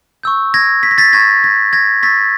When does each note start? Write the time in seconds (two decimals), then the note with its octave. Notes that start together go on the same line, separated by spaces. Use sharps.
0.23 C#6 E6 G6
0.54 G#6 A#6
0.83 B6
0.91 A#6
0.98 A6 B6
1.13 C#6 E6 G6 G#6 A#6
1.44 G#6 A#6
1.73 G#6 A#6
2.02 C#6 E6 G6 A6 B6